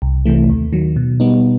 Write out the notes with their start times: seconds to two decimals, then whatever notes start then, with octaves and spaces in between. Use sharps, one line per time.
0.02 C2
0.25 C3 E3 A3
0.49 D#2
0.73 D#3 F#3
0.96 B2
1.20 G3 B3 D#4